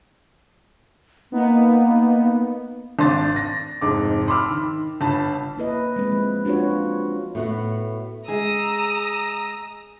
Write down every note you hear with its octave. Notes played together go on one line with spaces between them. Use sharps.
A#3 B3 D#4
G#1 D4 C6 A6
A#6
F1 G#2 D6
B5 C6 D6 E6 F6
D#3
G1 A5 B5
A#3 E4 B4 D#5
G#3 C4 B4
F3
D4 F4 F#4 B4 C#5
A2 B3 F#4
G#3 G#4 G#5 A#5 D#6 E6